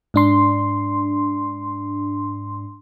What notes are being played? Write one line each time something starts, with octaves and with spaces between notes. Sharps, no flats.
G#2 D4 C6